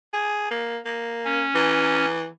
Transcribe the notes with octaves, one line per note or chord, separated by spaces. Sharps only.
G#4
A#3
A#3
C#4
E3